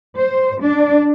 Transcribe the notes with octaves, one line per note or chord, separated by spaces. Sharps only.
C5
D4